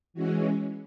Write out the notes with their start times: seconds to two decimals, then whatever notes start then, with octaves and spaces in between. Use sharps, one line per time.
0.14 E3 G#3 C#4 F#4